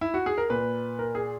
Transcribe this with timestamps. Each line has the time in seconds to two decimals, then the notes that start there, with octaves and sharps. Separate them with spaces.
0.01 E4
0.14 F#4
0.26 G#4
0.38 A#4
0.50 A#2 B4
0.99 A#4
1.15 G#4